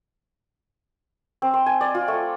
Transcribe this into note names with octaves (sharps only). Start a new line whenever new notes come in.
C4
C6
G#5
D5
F4
A3